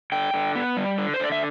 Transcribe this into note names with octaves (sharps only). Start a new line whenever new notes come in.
D3 G5
D3
B3
G3
D3
C5
D3 D5
E5